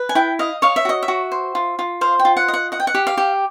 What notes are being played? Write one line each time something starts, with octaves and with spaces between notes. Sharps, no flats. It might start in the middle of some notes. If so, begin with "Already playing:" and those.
Already playing: B4
G#5
E4 G5
D#5 F5
C#5 F5
E5
F#4 D#5
E5
F#4
C5
F4
F4
C5 F5
G5
F4
F#5
D#5
F#5
D#5 F#5
G5
F#5
G4
F5
G4